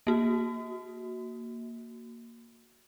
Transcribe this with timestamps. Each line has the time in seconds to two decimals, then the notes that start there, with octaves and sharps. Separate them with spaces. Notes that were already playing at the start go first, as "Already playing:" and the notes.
0.07 A#3 F#4